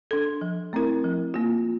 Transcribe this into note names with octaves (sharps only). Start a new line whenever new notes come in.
D4 A4
F3
A3 C4 E4 A#4
F3
A#3 F4